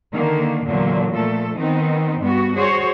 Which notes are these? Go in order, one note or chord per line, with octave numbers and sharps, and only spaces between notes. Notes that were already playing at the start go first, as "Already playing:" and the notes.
D3 D#3 A#3
E2 A#2 D3 F#3
A#2 F3 A3 A4
D#3 B3 C4 D#4
G2 B3 F#4
F#4 G#4 C5 C#5